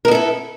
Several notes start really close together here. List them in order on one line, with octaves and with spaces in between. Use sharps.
A#4 B3 A4 E4